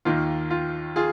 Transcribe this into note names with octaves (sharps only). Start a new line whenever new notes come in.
D#2 D#3 A#3 F4
F4
F4 G#4